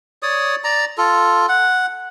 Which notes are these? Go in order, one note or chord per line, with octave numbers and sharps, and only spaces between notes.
C#5 D5 D#6
D5 A#5
F4 A4
F#5